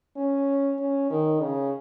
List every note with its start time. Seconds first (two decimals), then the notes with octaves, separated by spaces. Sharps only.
0.17 C#4
0.79 C#4
1.10 D#3
1.41 C#3